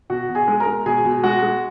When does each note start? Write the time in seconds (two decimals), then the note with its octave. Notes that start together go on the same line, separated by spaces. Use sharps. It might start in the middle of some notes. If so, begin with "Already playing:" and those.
0.10 B2 F#4 F#5
0.29 B2
0.35 G#4 G#5
0.48 G#3
0.60 A#4 A#5
0.67 G#3
0.86 B2 G#4 G#5
1.05 B2
1.23 G#3 F#4 F#5
1.42 G#3